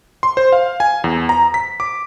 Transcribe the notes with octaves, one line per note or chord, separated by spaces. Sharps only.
C6
C5
F5
G#5
E2
A#5
B6
D6